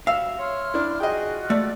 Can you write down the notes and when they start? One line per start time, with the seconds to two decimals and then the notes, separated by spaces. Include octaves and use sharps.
0.07 G2 F#4 E5 F5 E6
0.39 C#5 E5 C6 F6
0.74 D4 E4
1.00 F4 F#4 G#4 D#5 G5
1.50 A3 D5